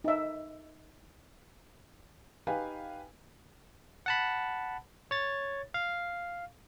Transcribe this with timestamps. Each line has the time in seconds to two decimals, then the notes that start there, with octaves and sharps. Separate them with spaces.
0.04 D#4 E5
2.47 D#4 G4 B4 F5 G5 G#5
4.06 F#5 A5 B5
5.11 C#5 A6
5.74 F5